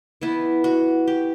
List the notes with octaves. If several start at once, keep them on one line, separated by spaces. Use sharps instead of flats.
E3 B3 E4
F#4
G4